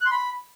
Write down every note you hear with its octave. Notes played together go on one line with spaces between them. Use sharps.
F#6
C6
B5